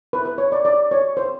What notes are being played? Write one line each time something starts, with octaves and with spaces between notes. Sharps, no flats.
B4
B4
C#5
D5
D5
C#5
C5